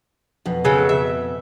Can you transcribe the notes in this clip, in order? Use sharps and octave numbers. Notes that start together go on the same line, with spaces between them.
F2 B2
C#3 F#3 A4
E5